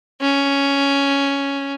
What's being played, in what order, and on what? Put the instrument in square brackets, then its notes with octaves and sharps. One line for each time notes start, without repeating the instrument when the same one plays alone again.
[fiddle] C#4